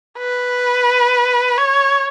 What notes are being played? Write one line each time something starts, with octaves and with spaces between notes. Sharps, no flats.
B4
C#5